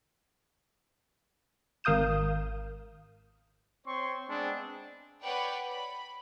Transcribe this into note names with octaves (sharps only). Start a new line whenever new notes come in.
G#1 A#4 F5 D#6 G6 E7
C4 C5 C#5 C6 C#6
G#3 B3 C4 D4 G#4
B4 C#5 D5 F#5 G5
B5